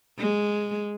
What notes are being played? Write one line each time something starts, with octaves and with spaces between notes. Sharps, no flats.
G#3